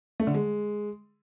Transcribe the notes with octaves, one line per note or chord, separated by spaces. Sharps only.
A3
D3
G#3